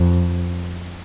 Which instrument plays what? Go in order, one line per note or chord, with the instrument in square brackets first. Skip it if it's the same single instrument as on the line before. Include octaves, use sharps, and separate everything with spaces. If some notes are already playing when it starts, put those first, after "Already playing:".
Already playing: [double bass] F2